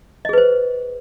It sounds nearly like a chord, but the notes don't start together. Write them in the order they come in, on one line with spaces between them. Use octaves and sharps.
D#5 G#4 B4 C5